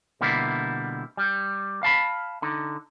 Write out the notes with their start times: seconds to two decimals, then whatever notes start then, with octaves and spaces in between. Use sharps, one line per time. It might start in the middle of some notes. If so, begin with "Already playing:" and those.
0.21 B2 D3 G3 A#3 E4 F4
1.17 G3
1.83 F5 A5 B5
2.42 D3 D#4